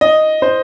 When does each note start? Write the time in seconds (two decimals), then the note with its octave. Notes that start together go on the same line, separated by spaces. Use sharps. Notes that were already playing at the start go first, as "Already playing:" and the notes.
0.01 D#5
0.42 C5